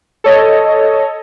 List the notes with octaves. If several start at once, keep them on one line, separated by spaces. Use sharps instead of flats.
A4 C#5 D#5